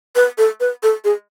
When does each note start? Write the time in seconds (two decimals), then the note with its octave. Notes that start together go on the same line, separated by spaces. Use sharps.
0.16 B4
0.38 A4
0.60 B4
0.83 A4
1.04 G#4